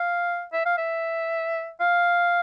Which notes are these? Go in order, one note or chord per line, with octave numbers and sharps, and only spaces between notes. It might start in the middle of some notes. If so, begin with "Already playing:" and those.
Already playing: F5
E5
F5
E5
F5